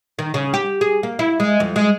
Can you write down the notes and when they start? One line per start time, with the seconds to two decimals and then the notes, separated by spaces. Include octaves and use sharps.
0.19 D#3
0.34 C#3
0.54 G4
0.81 G#4
1.03 A#3
1.19 E4
1.40 G#3
1.60 F2
1.76 G#3